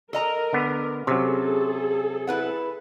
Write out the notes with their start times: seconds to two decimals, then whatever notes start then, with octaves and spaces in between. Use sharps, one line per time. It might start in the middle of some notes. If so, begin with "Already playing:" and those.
0.13 A4 A#4 D#5 A#5
0.53 D3 B3
1.07 C3 F#3 C#4 G#4 A4
2.27 E4 B4 F#5